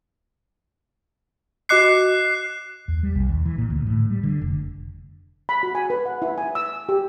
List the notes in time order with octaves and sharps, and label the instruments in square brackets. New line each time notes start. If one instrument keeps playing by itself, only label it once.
[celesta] F#4 D#5 C#7 [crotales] D6 F#6 C7
[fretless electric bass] E2
G3
B1
D#2
E3
A#2
D2
A2
G3
D3
F1
[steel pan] B5
F#4
G#5
B4
F#5
E4
G#5
E6
G4